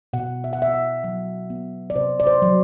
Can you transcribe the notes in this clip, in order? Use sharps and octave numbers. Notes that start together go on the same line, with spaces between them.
B2 F#5
E5
F#5
B3 E5
F#5
F#3 E5
B3
D5
C3 C5
D5
C5
F#3